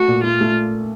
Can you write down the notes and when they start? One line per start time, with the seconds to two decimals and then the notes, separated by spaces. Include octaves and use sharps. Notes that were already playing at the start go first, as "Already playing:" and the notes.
Already playing: A3 F#4
0.08 A#2
0.23 A3 F4
0.41 A3